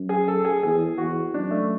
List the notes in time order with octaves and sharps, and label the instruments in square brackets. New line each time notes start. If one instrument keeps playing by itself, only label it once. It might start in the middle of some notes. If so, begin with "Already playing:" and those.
Already playing: [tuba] F#2
[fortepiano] G#4
A4
G#4
[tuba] E2 [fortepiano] G#4
[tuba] E2 [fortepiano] F#4
[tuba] F#2 [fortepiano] D4
[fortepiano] A3